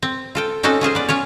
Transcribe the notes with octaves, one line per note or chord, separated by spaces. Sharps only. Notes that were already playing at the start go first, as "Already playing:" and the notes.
C4
F4 A4 G5
C4 C#4 D#4 F#4 A4
C#4 F4 G#4 C5
B3 D5
C#4 F4 C#5